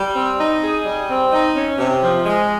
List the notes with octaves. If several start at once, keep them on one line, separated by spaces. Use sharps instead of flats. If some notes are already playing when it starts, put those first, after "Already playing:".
Already playing: G3
C4
D#4
G#4
G3
C4
D#4
C#4
C3
F3
G#3